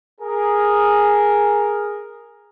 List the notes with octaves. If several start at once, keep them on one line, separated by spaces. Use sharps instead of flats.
G#4 A#4